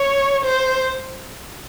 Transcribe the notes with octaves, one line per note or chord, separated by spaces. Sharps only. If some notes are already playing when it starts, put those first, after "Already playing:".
Already playing: C#5
C5